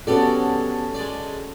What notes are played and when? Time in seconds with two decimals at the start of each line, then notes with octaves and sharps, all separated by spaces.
0.07 B3 C#4 F#4 G4 A4 D5
0.94 G#3 D5